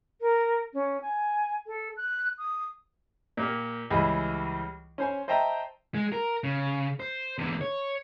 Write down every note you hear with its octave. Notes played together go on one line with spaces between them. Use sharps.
A#4
C#4
G#5
A4
F#6
D#6
A#2 A#3 G4 A#4
C#2 E3 G3 G#4 D#5 B5
C#4 C5 G#5
C5 D#5 E5 G5 A5 A#5
G#3
A#4
C#3
C5
E2 D3
C#5